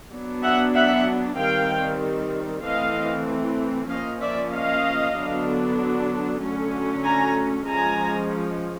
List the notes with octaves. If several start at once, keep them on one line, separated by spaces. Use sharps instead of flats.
F#3 B3 D4
E5 F#5
E5 F#5
D#3 G3 C4 F5 G5
E3 A3 C4 D#5 F5
F3 A#3 C#4 D#5 F5
D5 E5
D#5 F5
D3 F#3 B3 D4
D3 F#3 A3 C#4
G#5 A#5
F3 G#3 C#4 G#5 A#5